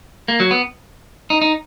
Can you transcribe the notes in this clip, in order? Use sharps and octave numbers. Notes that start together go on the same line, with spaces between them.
A#3
F#3
B3
D#4
D#4